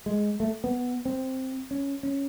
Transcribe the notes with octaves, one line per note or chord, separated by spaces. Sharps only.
G#3
A3
B3
C4
C#4
C#4